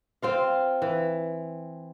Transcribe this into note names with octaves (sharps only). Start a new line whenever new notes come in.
C4 F4 F5
E3